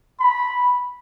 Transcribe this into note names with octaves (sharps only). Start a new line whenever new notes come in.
B5